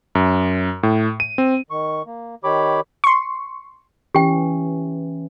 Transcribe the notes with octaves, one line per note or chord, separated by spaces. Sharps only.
F#2
A2
D#7
C4
D#3 C#6
A#3
D#3 G4 C#5 B5 D6
C6 C#6
E3 C#4 G4 G5